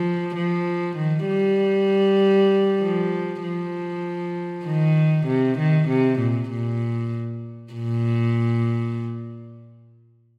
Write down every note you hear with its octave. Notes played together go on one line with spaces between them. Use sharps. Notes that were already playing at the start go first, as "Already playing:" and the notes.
Already playing: F3
F3
D#3
G3
F3
F3
D#3
C3
D#3
C3
A#2
A#2
A#2